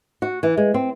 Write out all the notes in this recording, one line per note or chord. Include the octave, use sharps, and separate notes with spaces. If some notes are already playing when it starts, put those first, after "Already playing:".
F#4
E3
G#3
C4